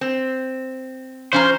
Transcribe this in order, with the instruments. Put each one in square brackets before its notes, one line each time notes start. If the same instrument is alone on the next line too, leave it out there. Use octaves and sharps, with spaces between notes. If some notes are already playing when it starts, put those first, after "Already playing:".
[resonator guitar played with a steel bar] C4
[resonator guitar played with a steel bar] F3 C#4 A#5 [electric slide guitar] C5